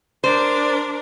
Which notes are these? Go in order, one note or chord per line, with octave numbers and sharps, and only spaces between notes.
D4 A#4 C5 D5